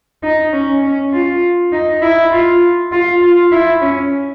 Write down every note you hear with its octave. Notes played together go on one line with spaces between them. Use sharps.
D#4
C#4
C#4
F4
D#4
E4
F4
F4
F4
E4
C#4